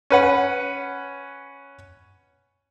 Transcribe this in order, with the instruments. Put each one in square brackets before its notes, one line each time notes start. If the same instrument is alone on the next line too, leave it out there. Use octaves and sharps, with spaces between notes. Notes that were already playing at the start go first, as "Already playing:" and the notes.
[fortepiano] C#4 B4 F#5